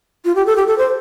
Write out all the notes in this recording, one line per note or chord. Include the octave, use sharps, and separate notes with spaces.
F4
G4
A4
G4
A4
C5